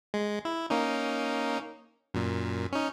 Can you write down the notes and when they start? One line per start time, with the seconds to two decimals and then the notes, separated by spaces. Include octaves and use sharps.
0.14 G#3
0.45 E4
0.70 A#3 C#4 D#4
2.14 F#2 A#2
2.72 C#4 D#4